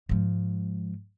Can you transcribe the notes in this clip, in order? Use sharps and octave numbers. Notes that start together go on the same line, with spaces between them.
G#2 F3